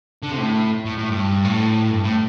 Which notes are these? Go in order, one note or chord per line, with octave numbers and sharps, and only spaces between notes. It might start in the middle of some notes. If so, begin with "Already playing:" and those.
D3
C3
A2
A2
A2
G2
A2
G2
A2